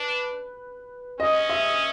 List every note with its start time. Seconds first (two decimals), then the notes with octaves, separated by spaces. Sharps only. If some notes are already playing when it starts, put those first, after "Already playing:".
Already playing: D4 B4
1.19 C#4 D#5
1.49 E5